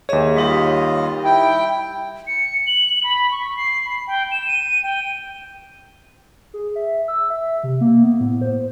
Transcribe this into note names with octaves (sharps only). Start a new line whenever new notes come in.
D#2 G#4 C#5 D#5 E5
G3 D#4 F4 G4 D#5
E4 G5
C#7
F#7
B5
C#6
C7
B5
G5
E7
D#7
G5
G#4
E5
E6
E5
C3
A#3
B3
A2
C5